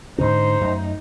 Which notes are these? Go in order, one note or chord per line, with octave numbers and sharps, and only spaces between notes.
G#2 D3 C#4 D#4 C5
F#2 F#3 A3